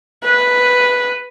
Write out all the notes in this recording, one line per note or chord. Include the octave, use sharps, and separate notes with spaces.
B4